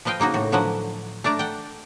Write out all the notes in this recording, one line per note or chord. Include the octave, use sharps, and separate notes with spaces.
F3 B4 D#5 F5 G5
C#3 A#3 D#4 F#4
A2 F#4
D3 F3 F#3 B4 F#5
A3 D4 D5 A#5
F#5 G5